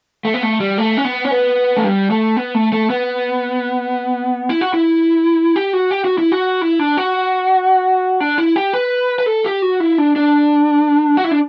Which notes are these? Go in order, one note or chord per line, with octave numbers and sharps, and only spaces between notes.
A3
B3
A3
G3
A3
C#4
B3
C#4
B3
A3
G3
A3
B3
A3
A3
B3
E4
F#4
E4
G4
F#4
G4
F#4
E4
F#4
E4
D4
F#4
D4
E4
G4
B4
B4
A4
G4
F#4
E4
D4
D4
F#4
E4
D4